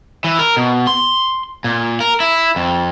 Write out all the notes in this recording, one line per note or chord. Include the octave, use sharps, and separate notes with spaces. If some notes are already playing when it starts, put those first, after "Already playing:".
E3
A#4
B2
C6
A#2
A#4
E4
F2